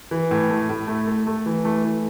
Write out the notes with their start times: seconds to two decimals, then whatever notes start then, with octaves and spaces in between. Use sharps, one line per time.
0.11 E3
0.31 A2
0.50 A3
0.69 A2
0.88 A3
1.07 A3
1.27 A3
1.46 E3
1.65 A3
1.84 E3